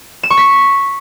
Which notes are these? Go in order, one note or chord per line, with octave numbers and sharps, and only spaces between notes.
E7
C#6
B6